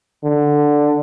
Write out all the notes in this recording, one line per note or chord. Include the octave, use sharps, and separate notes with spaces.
D3